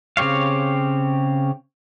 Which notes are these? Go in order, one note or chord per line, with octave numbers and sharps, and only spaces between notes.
C#3 C4 G4 C#5 F5